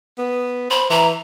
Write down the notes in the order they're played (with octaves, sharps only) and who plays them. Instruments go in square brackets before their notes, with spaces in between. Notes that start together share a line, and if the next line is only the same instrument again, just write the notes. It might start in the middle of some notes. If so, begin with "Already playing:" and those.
[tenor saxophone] B3
[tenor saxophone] C5 [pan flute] B5
[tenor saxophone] E3 [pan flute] A#5